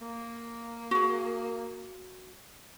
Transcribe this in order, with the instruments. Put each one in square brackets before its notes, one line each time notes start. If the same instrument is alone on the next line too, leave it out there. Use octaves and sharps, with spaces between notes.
[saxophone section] A#3
[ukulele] F#4 G#4